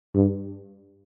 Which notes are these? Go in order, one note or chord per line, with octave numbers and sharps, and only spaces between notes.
G2